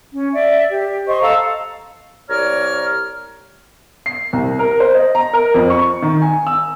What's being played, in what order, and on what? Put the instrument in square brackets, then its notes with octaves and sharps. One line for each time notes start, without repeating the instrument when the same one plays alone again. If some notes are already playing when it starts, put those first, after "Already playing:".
[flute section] C#4
D5 E5
G4
C5 D#5 C#6
A4 F5 A#5 E6
[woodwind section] C2 C#5 D5 A#5 F6
[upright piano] C7
C2
A#4
C5
D#5
A#5
A#4
F2
C#6
D#3
G#5
E6